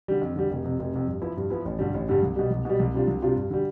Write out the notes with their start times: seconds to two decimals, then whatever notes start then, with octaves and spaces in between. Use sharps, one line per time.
0.08 D3 G3
0.21 F2
0.36 D3 G3
0.51 F1
0.64 F2 C3
0.80 F1
0.94 F2 C3
1.07 G2
1.22 F3 B3 E4
1.37 G2
1.50 F3 B3 E4
1.65 A1
1.79 G2 D3 G3
1.94 A1
2.08 G2 D3 G3
2.22 C2
2.36 B2 G3
2.50 C2
2.65 B2 G3
2.79 C2
2.94 C3 G3 D4 F4
3.07 C2
3.22 C3 G3 D4 F4
3.36 G2
3.50 D3 G3